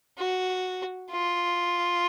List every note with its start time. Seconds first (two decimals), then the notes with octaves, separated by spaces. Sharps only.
0.18 F#4
1.11 F4